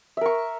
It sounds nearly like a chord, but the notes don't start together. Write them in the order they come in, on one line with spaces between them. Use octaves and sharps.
E5 A#4 C#6